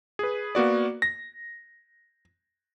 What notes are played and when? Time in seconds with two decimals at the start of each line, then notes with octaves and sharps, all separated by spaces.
0.19 G#4 B4
0.55 A#3 B3 F#4 D5
1.02 A#6